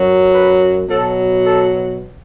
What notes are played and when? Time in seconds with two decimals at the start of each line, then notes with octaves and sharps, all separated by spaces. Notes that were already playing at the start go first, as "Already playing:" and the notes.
Already playing: F#2 F#3
0.34 B4
0.88 B2 F#3 A4
1.43 A4